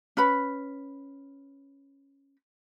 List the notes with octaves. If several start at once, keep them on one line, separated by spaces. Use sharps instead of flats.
C#4 B4 B5